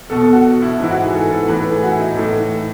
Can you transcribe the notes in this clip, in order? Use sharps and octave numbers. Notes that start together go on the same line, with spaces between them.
E2 B2 A4
A4
F#4
E4
G#2 E3 E4
F#4
G#4
A4
A4
A2 E3 B4
A4
G#4
F#4
E4
D#4
A2 E3 A4